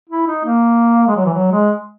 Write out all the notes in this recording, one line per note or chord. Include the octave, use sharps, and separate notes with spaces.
E4
D#4
A#3
G#3
F#3
E3
F#3
G#3